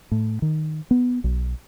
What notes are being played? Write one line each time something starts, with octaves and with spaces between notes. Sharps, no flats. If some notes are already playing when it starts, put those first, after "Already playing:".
A2
D#3
B3
B1